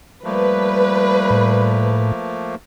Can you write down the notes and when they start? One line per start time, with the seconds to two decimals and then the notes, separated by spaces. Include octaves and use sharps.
0.24 F3 G3 A3 A#3 B4
1.30 A2